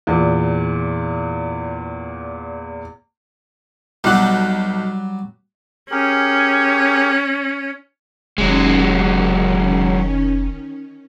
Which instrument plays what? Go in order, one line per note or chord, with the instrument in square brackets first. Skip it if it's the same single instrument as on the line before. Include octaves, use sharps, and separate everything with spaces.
[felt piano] E2 A#2
[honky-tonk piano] B1 F#6 [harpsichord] F#3 G3
[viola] C#4 [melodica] G4 G#4 A#4
[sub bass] F1 [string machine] D#3 C#4 [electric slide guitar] F#3 G#3